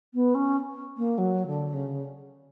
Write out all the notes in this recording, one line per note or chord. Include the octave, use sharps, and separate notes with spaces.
B3
C#4
A#3
F#3
D3
C#3